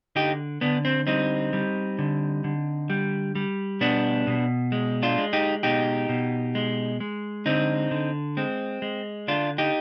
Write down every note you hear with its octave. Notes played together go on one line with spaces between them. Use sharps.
D3 D#4 G4
D3 B3 D4
C4
G3 C4 D#4
G3
D3
D3
G3
G3
B2 B3 D4
B2
G#3
D4 F4
G#3
D#4 G4
B2 D#4 G4
B2
G#3
G#3
D3 C4 D#4
D3
G#3 C4
G#3
D3 D4 F4
D#4 G4